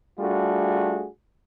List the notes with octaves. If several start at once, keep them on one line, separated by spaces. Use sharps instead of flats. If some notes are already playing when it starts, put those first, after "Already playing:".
G3 A3 D4 F4 F#4 G#4